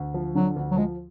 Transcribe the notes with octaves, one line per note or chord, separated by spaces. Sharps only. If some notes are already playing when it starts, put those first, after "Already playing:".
Already playing: D2
F3
D3 F#3
D2
F#3
F3 G#3